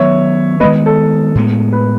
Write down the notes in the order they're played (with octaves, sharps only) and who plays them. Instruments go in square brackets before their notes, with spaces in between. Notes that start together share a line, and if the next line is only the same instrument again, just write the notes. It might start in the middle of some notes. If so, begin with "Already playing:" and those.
Already playing: [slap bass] D#3 F#3 B3 [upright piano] C#5 E5
[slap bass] D#3 G#3 B3 [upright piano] B4 D#5
[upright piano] A4
[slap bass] A2 G#3 B3
[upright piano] B4